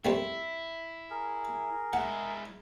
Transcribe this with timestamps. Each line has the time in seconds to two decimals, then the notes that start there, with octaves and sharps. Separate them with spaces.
0.05 F2 G3 A#3 E4
1.10 G#4 A#4
1.93 G#3 E4 F#5